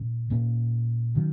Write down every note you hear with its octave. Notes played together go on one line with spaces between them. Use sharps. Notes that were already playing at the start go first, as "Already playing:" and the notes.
Already playing: A#2 C#4
A#2 A#3 C#4
D#3 F#3 C#4